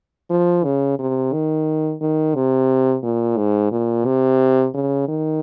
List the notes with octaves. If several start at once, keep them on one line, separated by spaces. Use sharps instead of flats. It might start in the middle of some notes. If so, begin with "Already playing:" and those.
F3
C#3
C3
D#3
D#3
C3
A#2
G#2
A#2
C3
C#3
D#3